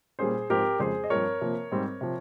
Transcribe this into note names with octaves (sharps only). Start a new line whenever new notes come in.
A#2 G3 A#3 C#4 G#4 C5
G#2 F3 C4 G4 A#4
F2 C#3 G#3 G#4 C5
D#5
G2 F3 C4 A#4 C#5
C3 F3 A#3
G#2 G3 C4
C3 F3